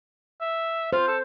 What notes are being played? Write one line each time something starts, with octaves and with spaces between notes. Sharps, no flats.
E5
F4 C5
A4